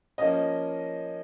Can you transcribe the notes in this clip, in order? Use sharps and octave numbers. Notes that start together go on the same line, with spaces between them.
F3 A#3 C#4 D#5